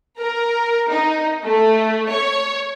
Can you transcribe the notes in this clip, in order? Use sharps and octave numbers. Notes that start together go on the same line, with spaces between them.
A#4
D#4
A3
C#5